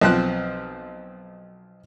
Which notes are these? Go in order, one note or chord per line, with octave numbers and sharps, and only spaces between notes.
B1 F3 C4 F#6